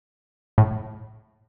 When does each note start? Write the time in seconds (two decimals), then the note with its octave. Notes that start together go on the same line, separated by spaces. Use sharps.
0.58 A2